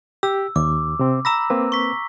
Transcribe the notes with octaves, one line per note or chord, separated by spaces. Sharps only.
G4 E6
D#2 D6
C3 C4
A#5 B5 E6 A#6
A#3 C4 B4
C#6 B6